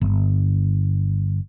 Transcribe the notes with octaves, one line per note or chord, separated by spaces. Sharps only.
G1